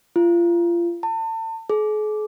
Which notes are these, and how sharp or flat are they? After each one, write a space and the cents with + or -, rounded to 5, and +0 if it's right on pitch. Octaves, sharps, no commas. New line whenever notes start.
F4 -30
A5 +35
G#4 +45